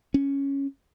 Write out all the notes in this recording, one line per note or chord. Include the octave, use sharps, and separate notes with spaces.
C#4